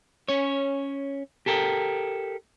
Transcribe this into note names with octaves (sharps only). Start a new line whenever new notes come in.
C#4 C#5
G4 A4 A#4 G5